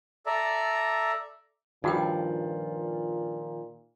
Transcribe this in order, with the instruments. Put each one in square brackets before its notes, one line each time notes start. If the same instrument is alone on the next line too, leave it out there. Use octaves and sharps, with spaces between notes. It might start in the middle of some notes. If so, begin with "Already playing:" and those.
[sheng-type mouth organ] A4 D5 E5 A#5
[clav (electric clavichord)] G2 [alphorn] A#2 [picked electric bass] D#3 F3 [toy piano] D#4 F#4 G5